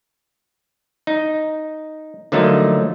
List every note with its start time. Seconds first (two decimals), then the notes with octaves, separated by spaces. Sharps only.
1.07 D#4
2.32 D3 F3 F#3 A3 A#3 D#4